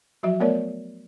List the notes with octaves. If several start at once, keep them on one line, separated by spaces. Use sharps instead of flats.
F3 F#3 F#4 E5
A3 B3 A#4 C#5 D5